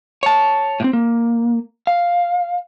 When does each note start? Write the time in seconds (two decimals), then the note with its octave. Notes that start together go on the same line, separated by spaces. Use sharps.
0.23 C#5 A5
0.80 A2 C4
0.93 A#3
1.87 F5